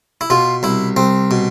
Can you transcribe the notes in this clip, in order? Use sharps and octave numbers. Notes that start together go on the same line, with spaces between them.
E4
B2 F4
C2 E4
C2 C4
B2